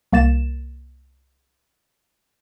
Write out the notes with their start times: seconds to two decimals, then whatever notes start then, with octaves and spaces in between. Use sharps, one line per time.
0.12 C2 A#3 A6 E7